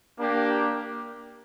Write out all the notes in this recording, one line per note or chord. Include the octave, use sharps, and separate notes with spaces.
A#3 D4 G4